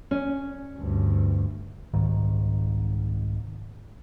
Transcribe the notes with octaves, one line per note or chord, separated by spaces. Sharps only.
C#4
D2 G2
C2 G#2 D#3